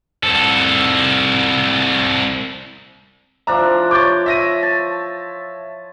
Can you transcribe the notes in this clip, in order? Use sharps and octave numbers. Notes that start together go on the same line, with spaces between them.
C2 A4
F3 D4 E5 A#5
C#5 D6 G6 A6
E5 A#6 D#7
A5